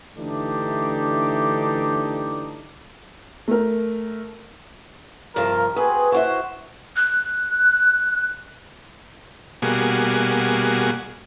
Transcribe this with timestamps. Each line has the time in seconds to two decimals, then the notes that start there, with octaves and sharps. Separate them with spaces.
0.16 D3 E3 A3 D4 D#4 G4
3.48 A3 A#4
5.36 G2 C3 F3 A#4
5.76 C4 F#4 G#4 B4
6.12 E4 F#4 C5 E5
6.96 F#6
9.62 B2 G3 A#3 F#4 G#4